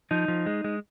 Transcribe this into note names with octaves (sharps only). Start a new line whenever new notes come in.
F3 D#4
F3
G#3
G#3